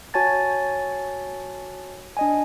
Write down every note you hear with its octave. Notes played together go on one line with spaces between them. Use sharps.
F#4 C#5 G#5 A5 A6
D4 D#5 G#5